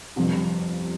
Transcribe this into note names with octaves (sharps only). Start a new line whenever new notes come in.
G1 F2 C3